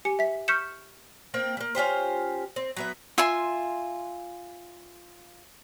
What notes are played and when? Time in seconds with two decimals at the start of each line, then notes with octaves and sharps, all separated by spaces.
0.05 G4 G#5 C#7
0.19 E5 B6
0.48 C#6 F6 G6 B6 C#7 E7
1.34 A#3 C4 G5
1.57 G3 A#3
1.75 C#4 F4 G4 C5
2.56 C4
2.77 F#3 B3 E5
3.18 F4 E5 G#5 C6